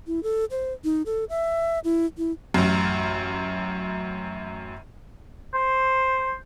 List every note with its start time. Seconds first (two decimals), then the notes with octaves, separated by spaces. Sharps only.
0.07 E4
0.23 A4
0.51 C5
0.84 D#4
1.06 A4
1.30 E5
1.84 E4
2.18 E4
2.54 A1 F#2
5.54 C5